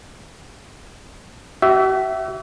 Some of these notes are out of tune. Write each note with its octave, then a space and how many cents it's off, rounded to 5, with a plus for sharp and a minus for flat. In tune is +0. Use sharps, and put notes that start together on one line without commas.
F#4 +45 E5 +0